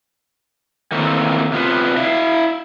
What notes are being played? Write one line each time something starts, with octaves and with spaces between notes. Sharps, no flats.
D#3 E3 A3 A#3 C4
C3 B3 F4 B4
E4 E5 F5